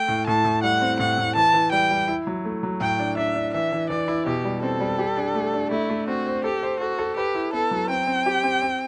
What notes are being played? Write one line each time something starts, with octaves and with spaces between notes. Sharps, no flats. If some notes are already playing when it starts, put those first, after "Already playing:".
Already playing: A3 G5
A2
A2 A5
A2
G3 F#5
C4
A2 F#5
A2
E3 A5
E3
G3 G5
G3
E4
F#3
A3
F#3
A2 G5
D4
D4 E5
D4
E3 E5
E3
E3 D5
E4
B2 G4
G3
C4 A4
G3
G4
D4
A3
D4
A3 E4
A3
C4 F#4
C5
G4 A4
C5
F#4 A4
A4
G4 B4
E4
B3 A4
F#3
C4 G5
C4
G4
C4
C4